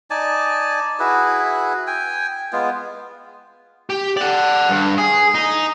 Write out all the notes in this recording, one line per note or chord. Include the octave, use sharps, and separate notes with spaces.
D#4 D5 G#5 A5
E4 F#4 G#4 B4
G5 G#5
G#3 B3 F4
G4
D5 F#5
G2
G#4
D#4 D#5